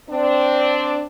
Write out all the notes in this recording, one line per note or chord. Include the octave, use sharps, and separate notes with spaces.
C4 D4